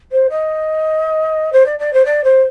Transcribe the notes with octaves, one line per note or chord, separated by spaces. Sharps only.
C5
D#5
C5
D5
D5
C5
D5
C5